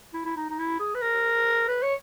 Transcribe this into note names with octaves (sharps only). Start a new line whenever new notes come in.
E4
E4
D#4
D#4
E4
G#4
B4
A#4
B4
C#5